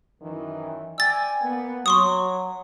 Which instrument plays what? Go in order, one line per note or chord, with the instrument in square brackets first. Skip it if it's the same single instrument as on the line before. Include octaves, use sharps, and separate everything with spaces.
[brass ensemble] F#2 D#3 E3
[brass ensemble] D5 G5 G#5 [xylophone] E6 A6
[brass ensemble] A#3 B3
[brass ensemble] F#3 [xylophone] C6 C#6 D#6